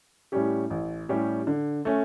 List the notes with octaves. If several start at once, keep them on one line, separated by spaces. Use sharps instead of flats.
A2 G3 C#4 G4
A1
A2 G3 C#4 G4
D3
A3 C#4